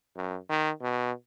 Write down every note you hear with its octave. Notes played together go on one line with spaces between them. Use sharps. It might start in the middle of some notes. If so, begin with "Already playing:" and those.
F#2
D#3
B2